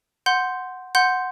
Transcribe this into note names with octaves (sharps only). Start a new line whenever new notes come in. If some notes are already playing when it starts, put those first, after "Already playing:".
F#5 C6 G6
F#5 C6 G6